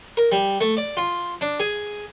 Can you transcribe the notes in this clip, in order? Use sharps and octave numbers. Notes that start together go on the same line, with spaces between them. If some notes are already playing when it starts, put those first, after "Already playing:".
A#4
G3
A3
D5
F4
D4
G#4